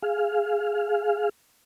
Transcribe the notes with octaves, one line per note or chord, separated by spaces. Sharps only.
G#4 F5